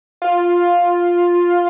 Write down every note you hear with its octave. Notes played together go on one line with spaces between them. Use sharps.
F4